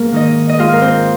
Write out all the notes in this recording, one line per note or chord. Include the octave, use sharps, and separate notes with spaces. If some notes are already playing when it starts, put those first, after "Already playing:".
Already playing: G#2 A#3 A#4
D#3 D#4 D#5
D#5
G#2 F4 F5
A#4
C4 C5